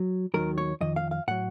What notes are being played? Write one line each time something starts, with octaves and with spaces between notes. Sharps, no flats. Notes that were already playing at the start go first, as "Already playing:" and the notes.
Already playing: F#3
D#2 D#3 F#3 A#4
C#5
F2 D#3 D#5
F5
F5
A2 F#3 F#5